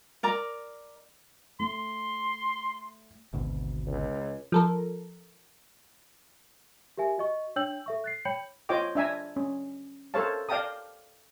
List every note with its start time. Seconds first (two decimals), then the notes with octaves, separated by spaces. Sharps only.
0.23 A#4 D5 A#5
1.60 A3 C6
3.33 G#1 D2 B2
3.87 C#2
4.52 F3 A4 A#4
6.97 G4 A#4 E5 G#5
7.18 F#4 D#5 C#6
7.56 D4 C#5 G5 E6 G6 F#7
7.86 A4 E5 C#6
8.04 F#6 A6 C7
8.25 C#5 G5 B5 G6 C#7 F#7
8.69 F4 C5 C#5 D#5 G5 D6
8.95 D4 E5 G#5 A#5
9.36 C#4
10.14 A4 A#4 C5 C#5 F5 A5
10.49 D5 F5 G5 A5 A#5 D#6